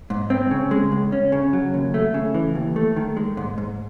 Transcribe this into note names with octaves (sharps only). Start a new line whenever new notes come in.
G#2
C4
C#3
G#3
C#2
C#4
C#3
F#3
D#2
A3
C#3
E3
D#2
A3
D#3
G#3
G#2
G#2